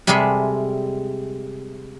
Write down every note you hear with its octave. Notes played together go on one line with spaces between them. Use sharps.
C3 G3 G#3 G#4 A4 E5